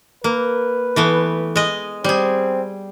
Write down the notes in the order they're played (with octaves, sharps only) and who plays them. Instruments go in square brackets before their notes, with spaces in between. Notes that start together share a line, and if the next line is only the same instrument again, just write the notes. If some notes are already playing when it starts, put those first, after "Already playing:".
[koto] A#3 [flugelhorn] B4
[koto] E3 A3 B3
G#3 D#5
[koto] G3 G#4 [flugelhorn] C4